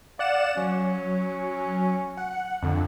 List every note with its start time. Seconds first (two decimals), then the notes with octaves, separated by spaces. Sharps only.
0.19 D5 F5 F#5 E7
0.57 F#3 C#4
2.17 F#5
2.63 F2 D3